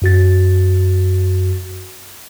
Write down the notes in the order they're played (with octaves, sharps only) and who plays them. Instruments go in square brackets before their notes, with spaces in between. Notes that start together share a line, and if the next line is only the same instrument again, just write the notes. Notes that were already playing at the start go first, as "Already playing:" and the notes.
[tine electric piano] F#2 F#4 A6